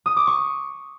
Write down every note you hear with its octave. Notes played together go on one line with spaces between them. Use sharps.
D#6
D6
C#6